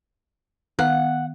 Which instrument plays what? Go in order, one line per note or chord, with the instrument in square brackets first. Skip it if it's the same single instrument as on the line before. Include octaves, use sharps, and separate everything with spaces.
[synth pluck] D#3 B3 F5 [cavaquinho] F#5